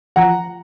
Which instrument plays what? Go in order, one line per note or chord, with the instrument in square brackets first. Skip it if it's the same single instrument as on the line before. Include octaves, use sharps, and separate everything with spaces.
[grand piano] F3 F#5 A#5